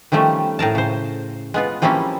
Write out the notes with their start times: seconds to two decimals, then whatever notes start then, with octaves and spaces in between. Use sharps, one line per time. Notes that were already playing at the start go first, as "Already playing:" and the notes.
0.12 D#3 F3 G3 A3 C#4
0.59 A2 G#4 A#4 A5
0.75 C#3 C5
1.54 G#3 B3 F4
1.82 F3 G3 A#3 C4 C#4 E4